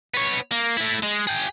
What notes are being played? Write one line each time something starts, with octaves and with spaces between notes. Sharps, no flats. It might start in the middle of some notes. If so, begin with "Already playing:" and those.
B3 C#5
A#3
A3 E4
G#3
G#4 G5